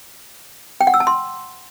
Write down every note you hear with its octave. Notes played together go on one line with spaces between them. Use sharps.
G5
F#5
E6
A5
C6